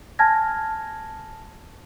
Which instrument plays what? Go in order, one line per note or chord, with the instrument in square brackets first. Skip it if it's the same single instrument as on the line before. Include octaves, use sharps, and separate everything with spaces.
[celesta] G#5 A5 F6 G#6 A#6